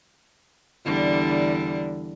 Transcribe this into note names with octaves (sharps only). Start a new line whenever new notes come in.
E2 D3 G3